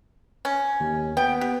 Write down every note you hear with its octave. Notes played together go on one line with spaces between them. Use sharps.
C#4
D#2
B3 G5
G4